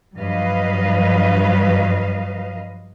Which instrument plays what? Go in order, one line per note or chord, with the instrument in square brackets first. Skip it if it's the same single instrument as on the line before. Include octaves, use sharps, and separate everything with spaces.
[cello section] G2 F3 F#3 B4 D#5 F5